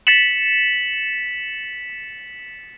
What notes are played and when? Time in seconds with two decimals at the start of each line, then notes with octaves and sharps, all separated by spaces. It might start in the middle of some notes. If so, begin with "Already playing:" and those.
0.07 A6 B6 C#7 E7 F#7